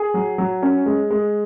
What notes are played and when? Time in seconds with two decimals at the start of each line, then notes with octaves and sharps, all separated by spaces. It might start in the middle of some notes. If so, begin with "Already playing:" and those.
Already playing: G#4
0.14 F#3
0.38 F#3
0.62 C#4
0.86 G#3
1.11 G#3